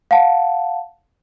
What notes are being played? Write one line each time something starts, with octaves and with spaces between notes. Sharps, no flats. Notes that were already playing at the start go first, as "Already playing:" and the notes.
F5 F#5 A5